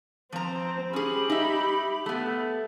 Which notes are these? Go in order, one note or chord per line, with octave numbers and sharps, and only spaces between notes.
F3 C4 A#5
C#4 G4 G#4 B5
D#4 E5
A3 B3